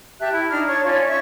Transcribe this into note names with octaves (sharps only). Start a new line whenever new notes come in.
G4 E5 A5 F#6
E4
D4 D#4 A#5 F6
C#5 A5 C#6
C#4 F4 C#5 D5
C#5 E5 C#6